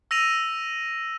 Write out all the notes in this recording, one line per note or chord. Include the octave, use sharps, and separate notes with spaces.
E6 A#6 D#7 F7